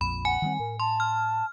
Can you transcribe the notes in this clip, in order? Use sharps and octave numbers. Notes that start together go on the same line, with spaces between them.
A#1 F2 B5
F#5 G#5
D#3 G3 C4
A2 A#4
A5 C6
F6